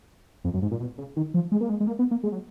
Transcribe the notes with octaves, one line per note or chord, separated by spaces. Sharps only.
F2
F#2
G#2
A#2
B2
C#3
D#3
F3
G#3
A#3
G#3
G#3
A#3
B3
A#3
G#3
F#3